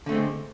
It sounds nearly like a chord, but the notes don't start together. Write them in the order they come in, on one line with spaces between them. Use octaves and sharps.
D3 A3 C4 G#3